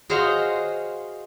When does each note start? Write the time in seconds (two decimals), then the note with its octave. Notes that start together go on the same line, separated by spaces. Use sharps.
0.10 F#4 G#4 C5 C#5 D#5 F5